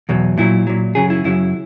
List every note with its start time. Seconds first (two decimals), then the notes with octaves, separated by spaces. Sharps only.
0.09 E2 B2 F#3
0.38 A#2 F#3 E4
0.67 A#2 F#3
0.95 F#2 C#3 F#3 G#4
1.10 E4
1.24 F#2 C#3 F#3 E4